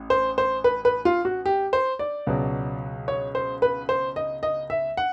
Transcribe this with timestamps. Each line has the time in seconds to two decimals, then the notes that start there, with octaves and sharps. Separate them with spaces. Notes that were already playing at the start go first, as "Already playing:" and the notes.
Already playing: A1
0.10 C5
0.38 C5
0.64 B4
0.85 B4
1.05 F4
1.25 F#4
1.46 G4
1.73 C5
1.99 D5
2.27 C#2 B2 F#3
3.08 C#5
3.35 C5
3.62 B4
3.89 C5
4.16 D#5
4.43 D#5
4.70 E5
4.97 F#5